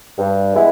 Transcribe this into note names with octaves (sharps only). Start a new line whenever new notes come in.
G2
E3 G#3 B3 E4